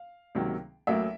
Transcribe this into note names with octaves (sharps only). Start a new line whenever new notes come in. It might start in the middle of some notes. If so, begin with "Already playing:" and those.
Already playing: F5
C#2 C3 D#3 F#3 A#3
A1 A2 F#3 A#3 E5